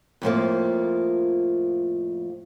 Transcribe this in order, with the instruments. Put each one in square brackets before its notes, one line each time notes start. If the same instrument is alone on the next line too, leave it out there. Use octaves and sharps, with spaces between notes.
[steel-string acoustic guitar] F2 A2 F3 A#3